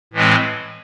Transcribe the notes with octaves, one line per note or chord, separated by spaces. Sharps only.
A2 E3 G#3 C4